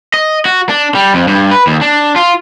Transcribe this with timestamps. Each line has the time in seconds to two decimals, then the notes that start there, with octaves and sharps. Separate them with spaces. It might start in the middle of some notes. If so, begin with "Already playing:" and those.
0.14 D#5
0.45 F#4
0.69 D4
0.95 G3
1.14 F2
1.28 G2
1.51 B4
1.67 D#2
1.81 D4
2.16 F4